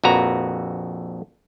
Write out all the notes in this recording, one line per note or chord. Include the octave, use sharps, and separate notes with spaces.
A#1 F2 F#4 B4 A#5